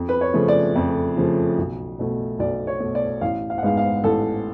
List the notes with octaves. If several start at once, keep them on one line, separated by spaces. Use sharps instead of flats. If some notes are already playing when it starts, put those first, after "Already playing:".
Already playing: F2
B4
C#5
C#3 F3 A3
D5
F2
C#3 F3 A3
B1
B2 A3
B1 D5
C#5
B2 A3
D5
A1 F5
F5
F#5
G#2 G#3 B3 F5
F5
A1 A4